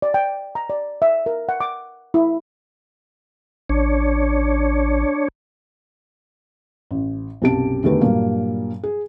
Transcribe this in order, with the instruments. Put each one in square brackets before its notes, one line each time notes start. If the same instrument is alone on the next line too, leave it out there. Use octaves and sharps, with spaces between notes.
[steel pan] D5
G5
A#5
D5
E5
A#4
F#5
D6
E4
[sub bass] A1 [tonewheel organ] D4 C#5
[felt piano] A1
B1 F#2 C3 G4 A5 D7
E2 D3 D#3 A3 G4 B4
G2 A#2 F#3 A#3
G#4